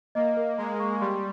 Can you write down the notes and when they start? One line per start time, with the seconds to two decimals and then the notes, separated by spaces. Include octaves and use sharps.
0.15 A#3 D#5
0.37 A#4
0.58 G#3 A#5
0.80 C#6
1.01 G3 C6